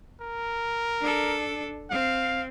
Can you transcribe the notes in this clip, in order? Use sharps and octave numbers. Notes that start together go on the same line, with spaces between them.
A#4
D4 A4
C4 F5